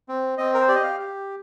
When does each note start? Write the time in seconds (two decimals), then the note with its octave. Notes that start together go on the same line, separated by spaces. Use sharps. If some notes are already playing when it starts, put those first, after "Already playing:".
0.09 C4
0.38 C4 D#5
0.54 A#4
0.61 C5
0.68 G4 D5
0.76 D#5
0.83 F5
0.99 G4